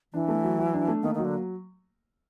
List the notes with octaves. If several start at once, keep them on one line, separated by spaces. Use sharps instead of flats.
E3 D4
A3
F#3
F#3
D4
A3
D#3 A#3
D#3 F#3
D3